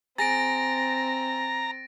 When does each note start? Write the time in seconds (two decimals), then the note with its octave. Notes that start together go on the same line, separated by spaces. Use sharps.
0.18 C4 G#4 A#5 A6 A#6 D7